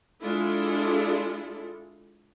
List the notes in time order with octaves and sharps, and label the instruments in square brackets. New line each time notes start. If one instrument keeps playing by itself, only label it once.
[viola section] G#3 D4 E4 F4 A4